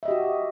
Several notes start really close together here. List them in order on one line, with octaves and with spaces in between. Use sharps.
E5 D#5 G4 F#4